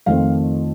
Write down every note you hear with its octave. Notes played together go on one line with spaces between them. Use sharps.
F2 D#3 A3 C4 F5